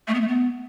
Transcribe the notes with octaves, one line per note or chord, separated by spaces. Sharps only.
A3
B3
A3
B3